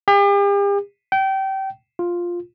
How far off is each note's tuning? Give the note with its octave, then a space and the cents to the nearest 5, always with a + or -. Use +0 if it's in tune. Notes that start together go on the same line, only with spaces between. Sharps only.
G4 +45
G5 -25
F4 +0